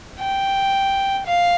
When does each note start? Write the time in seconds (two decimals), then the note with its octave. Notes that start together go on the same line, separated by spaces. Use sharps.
0.19 G5
1.27 F5